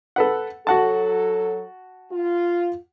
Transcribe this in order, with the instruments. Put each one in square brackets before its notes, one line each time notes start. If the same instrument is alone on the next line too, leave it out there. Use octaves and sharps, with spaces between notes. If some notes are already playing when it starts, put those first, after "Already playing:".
[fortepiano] A4 B4 F#5
[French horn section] F#3 A4 [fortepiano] F#4 F#5 A5
[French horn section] F4